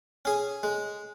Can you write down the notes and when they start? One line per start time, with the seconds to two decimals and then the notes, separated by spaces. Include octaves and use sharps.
0.25 C#4 G#4
0.63 G#3